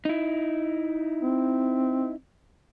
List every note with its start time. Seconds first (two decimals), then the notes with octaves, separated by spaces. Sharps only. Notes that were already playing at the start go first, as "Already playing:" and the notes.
0.05 D#4 E4
1.23 C4